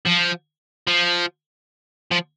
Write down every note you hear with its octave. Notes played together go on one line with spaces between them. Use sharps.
F3
F3
F3